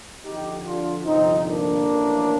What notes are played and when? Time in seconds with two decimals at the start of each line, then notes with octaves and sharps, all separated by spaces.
0.24 F2 D3 F3 D#4 G4
0.65 D4 F4
1.05 G1 F2 C3 F3 C4 D#4
1.46 A#3 D4
1.86 A1 A2 F3